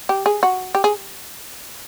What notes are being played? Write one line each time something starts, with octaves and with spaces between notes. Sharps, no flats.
G4
G#4
F#4
G4
G#4